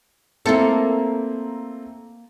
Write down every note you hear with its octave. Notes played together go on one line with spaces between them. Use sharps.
A3 A#3 C4 E4 A4